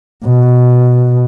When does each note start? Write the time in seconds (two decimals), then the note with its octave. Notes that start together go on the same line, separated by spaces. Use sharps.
0.25 B2